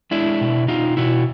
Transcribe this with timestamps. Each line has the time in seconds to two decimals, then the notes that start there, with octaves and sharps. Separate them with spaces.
0.11 G#3 D4 E4
0.41 B2
0.68 B2 D#4 F4
0.97 B2 E4 F#4